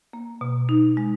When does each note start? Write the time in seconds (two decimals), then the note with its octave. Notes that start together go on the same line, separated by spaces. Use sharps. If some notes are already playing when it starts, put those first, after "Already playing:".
0.13 A#3
0.41 B2
0.69 D#4
0.97 G#3